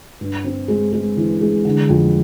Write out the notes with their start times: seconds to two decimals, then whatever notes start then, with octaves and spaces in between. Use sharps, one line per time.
0.21 G2
0.44 C4
0.68 G#3
0.93 G#3
1.17 E3
1.41 G#3
1.65 D3
1.89 F2